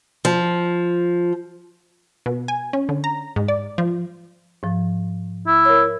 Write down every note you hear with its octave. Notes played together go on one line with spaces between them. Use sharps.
F3
B2
G#5
C#4
D3
A#5
G#2
D5
F3
G#2 F3
E4
A#4 C#5